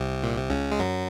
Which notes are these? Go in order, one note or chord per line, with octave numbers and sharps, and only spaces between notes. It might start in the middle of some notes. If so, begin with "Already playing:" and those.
Already playing: C2 C3
A#2
C3
C#2 C#3
G#3
F#2 F#3